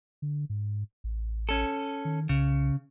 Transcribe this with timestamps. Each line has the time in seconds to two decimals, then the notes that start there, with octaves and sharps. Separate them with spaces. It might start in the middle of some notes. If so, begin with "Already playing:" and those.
0.22 D3
0.50 G#2
1.04 A1
1.49 C#4 A4
2.05 D#3
2.29 C2 C#3